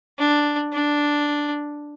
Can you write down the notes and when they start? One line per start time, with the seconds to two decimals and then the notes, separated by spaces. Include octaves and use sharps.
0.19 D4
0.73 D4